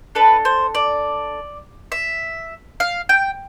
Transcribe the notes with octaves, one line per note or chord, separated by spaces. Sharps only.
D4 A4 B4
C5
D5
E5
F5
G5